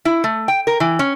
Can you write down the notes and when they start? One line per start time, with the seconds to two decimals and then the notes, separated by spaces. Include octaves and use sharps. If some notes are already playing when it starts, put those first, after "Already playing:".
0.05 E4
0.24 A3
0.48 G5
0.67 A#4
0.80 E3
0.99 C#4